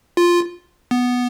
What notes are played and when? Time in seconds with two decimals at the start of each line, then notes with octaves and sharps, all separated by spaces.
0.17 F4
0.91 B3